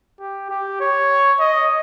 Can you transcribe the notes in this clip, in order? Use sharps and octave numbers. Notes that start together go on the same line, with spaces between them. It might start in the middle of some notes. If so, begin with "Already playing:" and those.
G4
G4
C#5
D#5